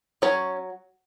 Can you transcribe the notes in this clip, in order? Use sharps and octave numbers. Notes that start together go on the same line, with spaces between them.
F#3 C#4 C#5